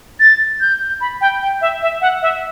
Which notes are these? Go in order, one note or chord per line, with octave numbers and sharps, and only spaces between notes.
A6
G6
B5
G5
G5
E5
E5
F#5
E5